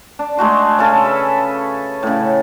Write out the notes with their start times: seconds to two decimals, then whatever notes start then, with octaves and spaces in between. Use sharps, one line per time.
0.19 D4
0.37 G#3 A3 F#4 C6
0.78 C#3 C#4 G#4 A4
1.04 B4 E5
2.03 A2 C#3